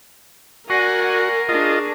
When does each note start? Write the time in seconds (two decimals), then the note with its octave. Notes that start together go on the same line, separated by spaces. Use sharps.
0.70 F#4 A#4 D5 F#5 G#5 C#6 A#6 C7
1.49 D4 F4 G#4 D#5